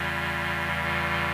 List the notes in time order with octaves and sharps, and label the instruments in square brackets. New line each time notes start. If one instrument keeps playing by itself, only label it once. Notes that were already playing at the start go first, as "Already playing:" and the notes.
Already playing: [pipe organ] E2 C#3 E3 G3 F4
F4